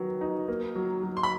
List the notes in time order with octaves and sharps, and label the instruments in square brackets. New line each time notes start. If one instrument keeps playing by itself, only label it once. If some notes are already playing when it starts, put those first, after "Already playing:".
Already playing: [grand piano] D#3 F#3 B3
D#4
A#3
F#3
F#3
[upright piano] C6
B5